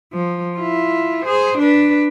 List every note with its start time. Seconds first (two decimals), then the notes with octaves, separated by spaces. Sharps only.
0.14 F3
0.56 E4 F4
1.25 G#4 C5
1.58 D4 B4